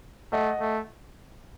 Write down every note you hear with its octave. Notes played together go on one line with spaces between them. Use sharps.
A3 D#5 F#5
A3